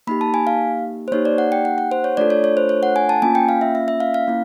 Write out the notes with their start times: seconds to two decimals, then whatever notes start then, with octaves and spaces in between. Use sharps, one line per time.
0.07 A#3 D#4 G4 B5
0.21 A5
0.34 G#5
0.47 F5
1.08 C5
1.12 A#3 D#4 G4 C#5
1.25 D5
1.38 F#5
1.52 G5
1.65 F#5
1.78 F#5
1.92 C5
2.04 C#5
2.17 A3 D4 F4 A4 D5
2.30 C#5
2.44 C#5
2.57 C5
2.69 C#5
2.83 F#5
2.96 G#5
3.09 A5
3.22 A#3 C#4 F4 G#5
3.35 G5
3.49 F5
3.61 E5
3.75 E5
3.88 E5
4.00 F5
4.14 F5
4.27 A#3 C#4 E4